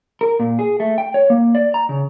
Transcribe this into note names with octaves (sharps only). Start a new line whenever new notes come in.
A#4
A#2
G#4
A3
G5
C#5
A#3
D5
A#5
C#3